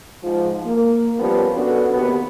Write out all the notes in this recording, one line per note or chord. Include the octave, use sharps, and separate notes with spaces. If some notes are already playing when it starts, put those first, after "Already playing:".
G#2 F3
A#3
F3 G3 A#3 B3 C#4
B3 C#4 D4 F#4 A4
D#2 C3 B3